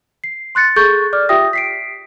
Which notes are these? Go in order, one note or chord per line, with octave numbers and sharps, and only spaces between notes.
C7
C6 F#6 A6 C#7
G#4 A4 C#6 G6 A6
D5 D6 F6
F4 G4 E5 G5 D#6 A#6
B6 C7 D7